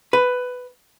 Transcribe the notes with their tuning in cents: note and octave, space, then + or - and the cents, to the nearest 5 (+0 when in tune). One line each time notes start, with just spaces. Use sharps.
B4 +10